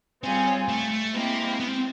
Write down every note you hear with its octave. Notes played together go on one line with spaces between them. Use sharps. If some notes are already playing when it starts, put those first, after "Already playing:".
G3 C4 C#4 F4 G#4
A3
A3
G#3 A#3 C4 E4 G4
B3
C4